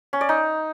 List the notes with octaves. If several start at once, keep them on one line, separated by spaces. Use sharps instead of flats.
C#4
D5
D#4